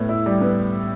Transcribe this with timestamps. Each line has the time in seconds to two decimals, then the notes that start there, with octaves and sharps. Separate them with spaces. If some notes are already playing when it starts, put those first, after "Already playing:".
Already playing: A2 B3
0.09 E4
0.26 G3
0.41 B3